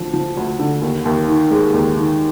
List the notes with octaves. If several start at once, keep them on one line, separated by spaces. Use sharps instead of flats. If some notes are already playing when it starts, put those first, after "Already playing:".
Already playing: D2 D3 F3
F3
D2
D3
D#2
D#2
D#3
G#3
D#2
D#3